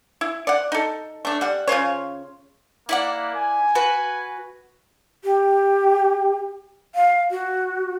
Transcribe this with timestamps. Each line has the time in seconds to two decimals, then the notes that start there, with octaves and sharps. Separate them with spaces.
0.21 E4
0.47 D5 F#5
0.72 D#4 A4
1.25 A3 D4
1.41 G3 F#5
1.67 C#3 F4 C5 C#5
2.89 A#3 E4 D5 F#5
3.35 G#5
3.75 F#4 B4
5.23 G4
6.95 F5
7.31 F#4